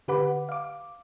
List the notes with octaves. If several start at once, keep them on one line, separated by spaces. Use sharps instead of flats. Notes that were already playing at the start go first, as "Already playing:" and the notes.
D3 G4 B4 F#5 B5 D6
F5 D6